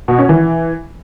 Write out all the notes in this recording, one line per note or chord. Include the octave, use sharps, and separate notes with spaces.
B2
C#4
E3